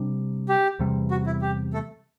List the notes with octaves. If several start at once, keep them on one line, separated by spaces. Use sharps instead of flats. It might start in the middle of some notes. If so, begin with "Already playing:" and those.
Already playing: C3 G3 D4
G4
E2 C3 G3
F#4
E4
G4
A3 A4